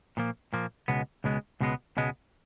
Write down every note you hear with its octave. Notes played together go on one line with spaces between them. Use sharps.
A#2 F3 A#3
A#2 F3 A#3
C#2 B2 G#3 B3
C#2 B2 G#3 B3
C#2 B2 G#3 B3
C#2 B2 G#3 B3